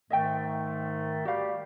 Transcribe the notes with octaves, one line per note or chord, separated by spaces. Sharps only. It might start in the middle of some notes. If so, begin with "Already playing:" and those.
G#2 D#3 A3 D#5 E5 G5
G3 F#4 G4 F5